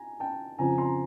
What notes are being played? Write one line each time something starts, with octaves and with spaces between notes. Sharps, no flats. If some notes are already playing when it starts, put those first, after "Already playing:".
Already playing: G#5 A#5
G5 A5
F2 C#3 F3 G#5 A#5
A#5 C6